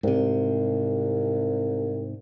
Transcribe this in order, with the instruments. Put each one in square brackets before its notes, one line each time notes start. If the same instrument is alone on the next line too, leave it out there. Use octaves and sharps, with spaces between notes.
[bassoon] C2 [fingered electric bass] G#2 C3